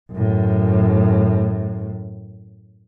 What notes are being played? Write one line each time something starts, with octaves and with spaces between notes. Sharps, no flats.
F#2 A2